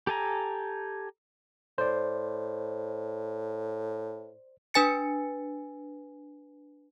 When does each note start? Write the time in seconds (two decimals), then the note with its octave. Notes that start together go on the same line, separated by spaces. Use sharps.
0.07 G4 A4 G#5 A#5
1.78 A2 C5 D5
4.74 D4 B4 G#5 A6 C#7